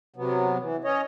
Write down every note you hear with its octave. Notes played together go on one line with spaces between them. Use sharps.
C3 F#3 B3
E3
C#4 C#5 D#5